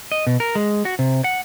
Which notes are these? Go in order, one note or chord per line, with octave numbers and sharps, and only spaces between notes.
D#5
B2
A#4
G#3
F#4
C3
F#5